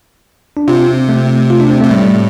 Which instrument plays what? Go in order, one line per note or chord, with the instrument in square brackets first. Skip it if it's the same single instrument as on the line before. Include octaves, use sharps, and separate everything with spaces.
[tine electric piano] D4
[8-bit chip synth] C3 [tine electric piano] F4
[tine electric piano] C4
A3
F4
D4
C4
[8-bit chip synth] C3 [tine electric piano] A3
[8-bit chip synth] A2 [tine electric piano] G3